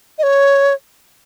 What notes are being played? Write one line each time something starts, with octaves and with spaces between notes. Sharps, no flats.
D#5
C#5